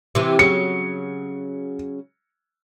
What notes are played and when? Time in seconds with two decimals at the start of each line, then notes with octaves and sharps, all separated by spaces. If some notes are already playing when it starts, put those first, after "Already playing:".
0.15 C3 E3
0.39 C#3 F#3 C#7